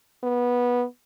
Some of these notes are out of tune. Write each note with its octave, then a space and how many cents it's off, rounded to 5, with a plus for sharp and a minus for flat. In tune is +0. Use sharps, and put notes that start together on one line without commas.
B3 -15